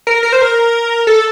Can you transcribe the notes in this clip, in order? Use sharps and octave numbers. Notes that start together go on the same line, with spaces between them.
A#4
A#4
C5
A#4
A4